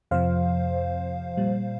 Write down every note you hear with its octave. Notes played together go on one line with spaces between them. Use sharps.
F2 C3 F3 C5 F5
A#2 G3